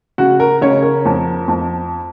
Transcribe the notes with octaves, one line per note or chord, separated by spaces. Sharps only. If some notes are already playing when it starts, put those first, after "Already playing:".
C#3 F#4
A#4
C#3 C#5
A#4
F2
F2